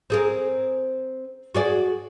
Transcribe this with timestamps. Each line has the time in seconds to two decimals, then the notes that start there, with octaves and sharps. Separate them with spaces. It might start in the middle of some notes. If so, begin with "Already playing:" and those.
0.10 C4 G#4 A#4
1.55 F#4 G#4 D5